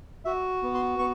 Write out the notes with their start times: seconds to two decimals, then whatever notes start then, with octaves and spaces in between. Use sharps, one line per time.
0.25 F#4 E5
0.63 B3
0.74 C6
0.99 B3 C#6